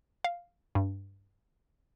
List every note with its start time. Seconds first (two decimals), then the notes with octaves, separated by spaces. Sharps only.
0.24 F5
0.75 G2